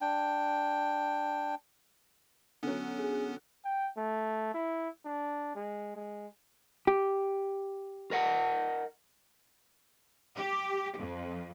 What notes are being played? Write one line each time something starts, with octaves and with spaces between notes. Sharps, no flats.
D4 G5
D3 F#3 B3 C#4
G#4
G5
A3
E4
D4
G#3
G#3
G4
A#4 D#5 F#5
G4
F2